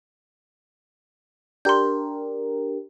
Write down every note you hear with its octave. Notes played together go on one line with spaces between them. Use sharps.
D4 G4 A#4 C6 G6